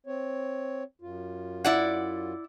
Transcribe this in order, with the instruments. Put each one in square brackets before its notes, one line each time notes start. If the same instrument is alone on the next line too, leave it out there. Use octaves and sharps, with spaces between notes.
[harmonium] C4 C#5
F#2 F4
[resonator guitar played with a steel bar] E4 D5 F#5